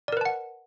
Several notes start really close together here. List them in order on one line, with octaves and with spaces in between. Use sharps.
D5 A#4 B4 A5 F#5